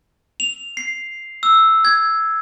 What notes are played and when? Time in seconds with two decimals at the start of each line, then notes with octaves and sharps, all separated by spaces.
0.40 F7
0.77 C7
1.43 E6
1.85 G#6